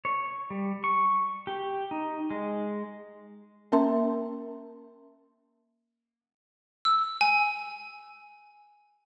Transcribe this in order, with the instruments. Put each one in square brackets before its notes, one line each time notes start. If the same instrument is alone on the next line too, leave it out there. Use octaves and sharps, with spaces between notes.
[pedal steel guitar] C#5
G3
C#6
G4
D#4
G#3
[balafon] A#3 C#4 A#4 E5 A5 C6
[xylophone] E6
G#5